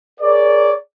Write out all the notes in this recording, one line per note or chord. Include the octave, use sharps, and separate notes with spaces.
G#4 A#4 C#5 D5